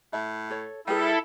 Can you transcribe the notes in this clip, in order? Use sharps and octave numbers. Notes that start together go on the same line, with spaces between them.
A2 E5
A4 C#5
G3 E4 G#4 A4 B4 G5